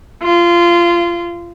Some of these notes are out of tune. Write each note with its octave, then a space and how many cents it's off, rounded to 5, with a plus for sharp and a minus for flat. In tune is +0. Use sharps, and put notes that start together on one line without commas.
F4 -20